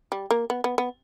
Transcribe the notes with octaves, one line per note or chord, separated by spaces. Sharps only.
G3
A#3
B3
B3
B3